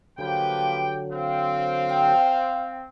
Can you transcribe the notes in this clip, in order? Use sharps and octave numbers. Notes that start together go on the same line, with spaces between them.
D3 F3 F#3 A#3 G4 B4 G5
C4 C5 F5
G5 D#6